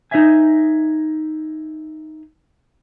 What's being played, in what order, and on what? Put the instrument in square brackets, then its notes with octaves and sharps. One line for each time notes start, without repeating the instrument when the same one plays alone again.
[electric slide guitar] D#4 F4 C5 D#5 E5 G#5